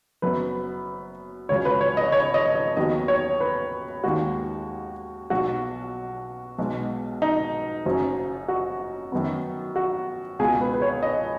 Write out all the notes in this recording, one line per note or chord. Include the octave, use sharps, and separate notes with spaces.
F#1 F#2 F#3 B3 B4
C#2 C#3 F#3 C#5
B4
C#5
D#5
C#5
D#5
D#5
D#2 D#3 F#3 B3 D#5
C#5
B4
D#2 D#3 G#3 F#4
B1 B2 F#3 F#4
B1 B2 G#3
D#4
F#1 F#2 F#3 C#4
F#4
F#2 D#3 F#3 B3
F#4
C#2 B2 B3 G#4
B4
B4
C#5
D#5